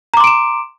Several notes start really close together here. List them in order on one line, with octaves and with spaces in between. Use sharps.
A#5 D6 C6 D7 E7